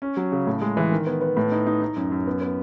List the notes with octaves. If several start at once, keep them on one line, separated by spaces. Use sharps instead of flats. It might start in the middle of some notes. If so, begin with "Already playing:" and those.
C#4
F#3
C#3
A2
G#3
E3
D#3
B3
B3
A2
D#4
D#4
D#4
F#2
F#2
B3
B3